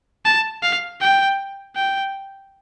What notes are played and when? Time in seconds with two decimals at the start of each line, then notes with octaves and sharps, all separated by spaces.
0.25 A5
0.63 F5
1.01 G5
1.76 G5